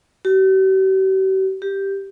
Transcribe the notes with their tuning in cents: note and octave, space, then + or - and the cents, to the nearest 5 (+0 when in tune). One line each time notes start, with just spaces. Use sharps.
G4 -45
G4 +0